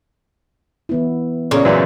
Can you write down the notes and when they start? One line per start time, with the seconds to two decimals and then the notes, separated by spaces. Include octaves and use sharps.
0.89 E3 B3 E4
1.51 A#2 C#3 A#3 C#5 C#6
1.65 F#2 E3 F#3 C5 D5